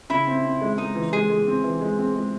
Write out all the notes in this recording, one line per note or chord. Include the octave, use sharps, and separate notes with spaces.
C#3 E4
C4
C4
G#3
G#3 D#4
E3
G#3 G#4
G#3
C4
E3
G#3
C4
G#3